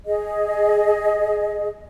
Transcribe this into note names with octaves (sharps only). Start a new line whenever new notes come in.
G#4 D#5